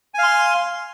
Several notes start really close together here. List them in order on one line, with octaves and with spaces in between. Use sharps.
G#5 F5 C6